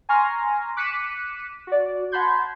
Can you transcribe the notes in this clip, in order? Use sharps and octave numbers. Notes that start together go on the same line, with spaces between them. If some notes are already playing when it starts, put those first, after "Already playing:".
G#5 A#5 C6 C#6 F6 A#6
D6 F#6 B6 C#7 D#7 E7
F#4 D5
F#5 A5 B5 C6 G6 G#6